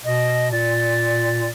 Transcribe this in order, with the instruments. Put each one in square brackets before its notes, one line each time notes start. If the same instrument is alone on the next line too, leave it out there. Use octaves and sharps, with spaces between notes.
[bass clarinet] B2 [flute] D#5
[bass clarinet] A#2 [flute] D5